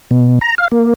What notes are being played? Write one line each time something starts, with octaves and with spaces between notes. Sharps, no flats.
B2
A#5
F5
A#3